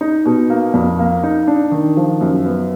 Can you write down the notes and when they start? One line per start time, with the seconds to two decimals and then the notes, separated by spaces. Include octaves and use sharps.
0.01 D#4
0.26 B2
0.50 A#3
0.74 F2
0.99 A#3
1.23 D#4
1.47 D4
1.72 D#3
1.97 F3
2.21 F#2
2.45 B3